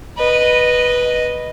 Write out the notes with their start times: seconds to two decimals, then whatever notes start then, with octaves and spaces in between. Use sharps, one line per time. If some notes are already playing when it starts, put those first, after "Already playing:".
0.17 B4 D#5